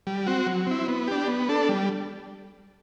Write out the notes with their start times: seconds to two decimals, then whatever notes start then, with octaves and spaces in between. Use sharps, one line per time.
0.07 G3
0.27 C4 F#4
0.46 F#3
0.67 C4 E4
0.88 B3
1.08 D4 G4
1.28 B3
1.49 D4 A4
1.69 G3